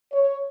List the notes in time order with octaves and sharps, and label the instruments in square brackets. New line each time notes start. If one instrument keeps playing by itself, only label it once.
[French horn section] C#5